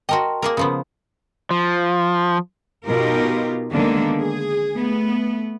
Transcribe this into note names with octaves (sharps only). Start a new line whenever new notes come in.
F#4 A#4 D#5 G5 A5 C6
A#3 G#4 A#4
C#3 F3 B3 D#6
F3
B2 D#4 F4 G4 A#4
D3 D#3 G#3 A#3 B3 D4
G#4
A3 B3